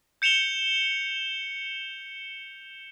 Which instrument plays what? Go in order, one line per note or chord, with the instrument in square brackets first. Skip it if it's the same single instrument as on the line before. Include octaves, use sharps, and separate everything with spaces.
[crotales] G6 C#7 E7 F7 G7